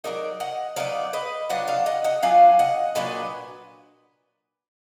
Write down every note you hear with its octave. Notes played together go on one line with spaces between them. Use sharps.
F#3 B3 D#4 A#4 D5
D#5 F#5
F#3 B3 D#4 D5 F5
B4 D#5
F#3 D4 F4 D#5 F#5
D5 F5
D#5 F#5
D#5 F#5
F#3 D4 F4 F5 G#5
D#5 F#5
A#2 F#3 D4 B4 D#5